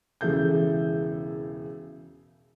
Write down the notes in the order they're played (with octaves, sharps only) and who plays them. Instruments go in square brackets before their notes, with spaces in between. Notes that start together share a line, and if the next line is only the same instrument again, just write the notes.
[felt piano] E1 C#3 E3 A4 G6